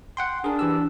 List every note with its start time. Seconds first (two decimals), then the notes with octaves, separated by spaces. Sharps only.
0.17 F#5 G5 C6
0.44 D4 G#4 A#4
0.59 E3 G4 E6